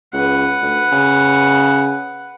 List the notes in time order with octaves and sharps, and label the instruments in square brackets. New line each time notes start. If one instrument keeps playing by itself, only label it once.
[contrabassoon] C#2 [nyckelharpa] B4 F#5
[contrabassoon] D2
C#3